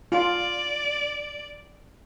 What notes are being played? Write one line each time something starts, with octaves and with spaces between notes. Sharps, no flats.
F4 D5